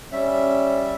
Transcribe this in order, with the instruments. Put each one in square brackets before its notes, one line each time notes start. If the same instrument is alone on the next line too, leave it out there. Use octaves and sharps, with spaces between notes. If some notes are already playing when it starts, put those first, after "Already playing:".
[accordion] G3 E5 [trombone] C#4